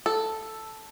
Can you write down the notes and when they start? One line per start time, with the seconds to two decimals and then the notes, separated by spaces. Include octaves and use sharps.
0.06 A4